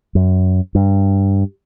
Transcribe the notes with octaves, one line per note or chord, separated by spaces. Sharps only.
F#2
G2